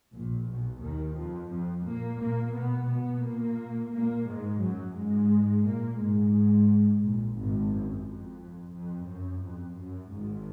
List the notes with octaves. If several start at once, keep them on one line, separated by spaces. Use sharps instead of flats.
A#1 A#2
B1 B2
D#2 D#3
F2 F3
F2 F3
A#2 A#3
A#2 A#3
B2 B3
B2 B3
A#2 A#3
A#2 A#3
G#2 G#3
F#2 F#3
G#2 G#3
A#2 A#3
G#2 G#3
A#1 A#2
G#1 G#2
F#2
F2
F2
F#2
F2
F#2
G#1 G#2